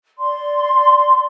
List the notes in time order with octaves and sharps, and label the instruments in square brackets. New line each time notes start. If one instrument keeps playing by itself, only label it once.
[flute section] D5 C6